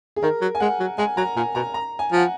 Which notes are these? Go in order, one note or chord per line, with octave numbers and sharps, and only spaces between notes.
G#4
D#3 A#4
F#3
G#5
G#3 F#5
F#3
G#3 G#5
F#3 A#5
A#2 G#5
B2 A#5
A#5
G#5
F3 F#5